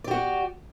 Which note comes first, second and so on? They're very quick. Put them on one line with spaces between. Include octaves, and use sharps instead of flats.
D5 G4 F#4